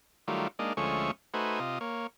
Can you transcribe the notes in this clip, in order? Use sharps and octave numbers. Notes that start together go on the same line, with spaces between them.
D#3 F#3 G3 A3 F4
G#3 A#3 D4 D#4
D2 F3 G#3 A3 C#4 C#6
A3 D#4 F#4 B4 C5 G#5
C3 F4 D#5
A#3 C#5